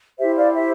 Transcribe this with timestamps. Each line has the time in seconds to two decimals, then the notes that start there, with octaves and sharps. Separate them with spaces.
0.19 E4 G4 C5 E5
0.36 D5 F5
0.54 E5